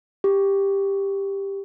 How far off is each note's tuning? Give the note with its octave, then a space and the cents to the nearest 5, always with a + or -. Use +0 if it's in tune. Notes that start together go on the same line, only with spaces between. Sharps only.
G4 +10